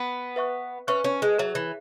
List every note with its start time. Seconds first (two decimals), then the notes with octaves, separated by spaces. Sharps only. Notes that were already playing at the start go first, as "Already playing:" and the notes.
Already playing: B3
0.36 B4 E5 C#6 F#6
0.87 C#4 B4 E5 C#6 F#6
1.04 C#4
1.22 G#3
1.38 F#3 G#4 C#5 E5
1.55 E3